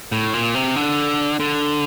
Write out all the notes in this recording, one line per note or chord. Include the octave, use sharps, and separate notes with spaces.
A2
A#2
C3
D3
D3